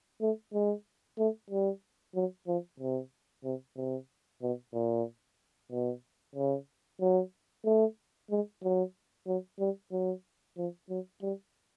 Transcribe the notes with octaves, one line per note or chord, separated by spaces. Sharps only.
A3
G#3
A3
G3
F#3
F3
C3
C3
C3
B2
A#2
B2
C#3
F#3
A3
G#3
F#3
F#3
G3
F#3
F3
F#3
G3